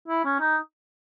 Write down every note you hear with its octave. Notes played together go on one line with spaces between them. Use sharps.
E4
C#4
D#4